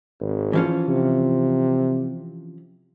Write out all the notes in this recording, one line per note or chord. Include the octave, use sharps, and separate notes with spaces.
G#1
E3 F3 C#4
C3